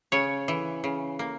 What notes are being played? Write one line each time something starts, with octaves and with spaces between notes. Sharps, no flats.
C#3 C#5
E3
C#3
A#3